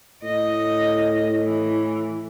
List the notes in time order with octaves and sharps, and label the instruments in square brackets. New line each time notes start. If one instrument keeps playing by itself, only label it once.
[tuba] A2 [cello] D#5
[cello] E3